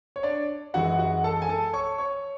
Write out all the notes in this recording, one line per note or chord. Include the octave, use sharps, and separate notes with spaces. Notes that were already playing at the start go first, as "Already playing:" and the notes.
C#5
D4 D5
F#2 E3 G#3 F#4 F#5
F#4 F#5
A4 A5
G#5
A4 A5
C#5 C#6
C#5 C#6